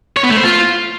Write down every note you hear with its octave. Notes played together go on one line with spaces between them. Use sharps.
C#5
B3
A3
C5
F4